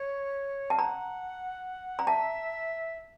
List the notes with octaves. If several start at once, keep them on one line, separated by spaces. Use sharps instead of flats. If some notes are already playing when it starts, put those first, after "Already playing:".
Already playing: C#5
F5 A5
F#5 A#5
A#5
E5 A5